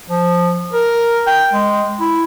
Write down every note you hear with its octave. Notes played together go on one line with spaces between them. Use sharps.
F3
A#4
G5
G#3
E4